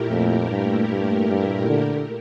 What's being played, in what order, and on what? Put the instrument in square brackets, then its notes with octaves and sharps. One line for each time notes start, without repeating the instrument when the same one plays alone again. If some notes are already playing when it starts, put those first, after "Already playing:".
Already playing: [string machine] A#2 A3 E4 G4 A#4
[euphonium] F2
G2
G2
G2
D3